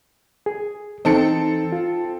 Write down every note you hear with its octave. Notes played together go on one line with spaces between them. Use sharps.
G#4
E3 C4 D#4 A4 C#7
F4